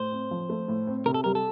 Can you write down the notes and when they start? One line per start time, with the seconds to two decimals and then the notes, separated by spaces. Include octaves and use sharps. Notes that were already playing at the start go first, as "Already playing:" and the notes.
Already playing: A2 C5
0.12 C4
0.31 F3
0.49 A3
0.68 A2
0.87 C4
1.06 C3 A#4
1.14 A4
1.24 G3 A#4
1.35 A4